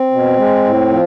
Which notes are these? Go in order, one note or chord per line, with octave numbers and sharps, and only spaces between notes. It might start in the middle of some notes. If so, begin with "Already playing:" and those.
Already playing: C4
B2
G#3
A2
F3